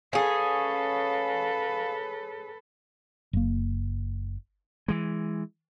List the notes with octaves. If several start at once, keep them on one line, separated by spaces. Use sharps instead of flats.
C#4 G#4 A4 B4 F5
F#1 A#3
E3 G#3